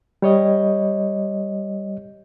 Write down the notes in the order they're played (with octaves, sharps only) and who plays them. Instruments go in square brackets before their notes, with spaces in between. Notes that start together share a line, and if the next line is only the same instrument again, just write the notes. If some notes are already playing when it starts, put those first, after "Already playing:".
[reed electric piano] G3 C#5 D#5